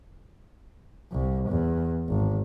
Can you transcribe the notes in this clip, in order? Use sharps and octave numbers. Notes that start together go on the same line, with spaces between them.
C2
E2
G#1